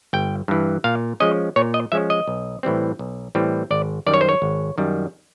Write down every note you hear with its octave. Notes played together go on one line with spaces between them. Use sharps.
G1 G5
G2 E3
A#2 F5
F3 G#3 C#4 D#5
A#2 C#5
D#5
F3 G#3 C#4 E5
D#5
B1
A2 E3 G3 C4
B1
A2 E3 G3 C4
G#1 D5
F#2 D#3 G3 D5
C#5
C5
C#5
G#1
F#2 D#3 G3